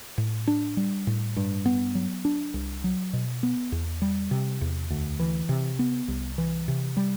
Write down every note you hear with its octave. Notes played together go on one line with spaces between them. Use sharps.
A2
D4
G3
A2
G2
B3
F#3
D4
C2
F#3
B2
B3
E2
G3
C3
E2
D2
E3
C3
B3
C2
E3
C3
G3